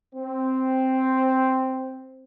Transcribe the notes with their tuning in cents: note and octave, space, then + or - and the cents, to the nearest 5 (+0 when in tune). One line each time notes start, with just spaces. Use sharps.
C4 +0